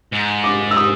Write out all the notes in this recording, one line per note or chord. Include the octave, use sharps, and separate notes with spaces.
G#2
D6
E6
D#6